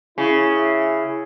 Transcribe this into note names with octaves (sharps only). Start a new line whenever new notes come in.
C#3 E4